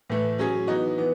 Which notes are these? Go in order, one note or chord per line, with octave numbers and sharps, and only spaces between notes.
A2 E3 A3
F#3 C#4 G#4
E3 B3 D#4 F#4
E3 B3